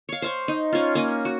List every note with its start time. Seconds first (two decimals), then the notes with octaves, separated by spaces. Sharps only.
0.09 C#5 F5
0.22 C5 F5 C#6
0.48 D#4
0.72 C#4 F4
0.95 A#3 C#4 G#5
1.25 F#4